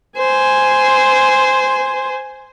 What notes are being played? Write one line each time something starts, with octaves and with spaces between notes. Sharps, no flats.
C5 G#5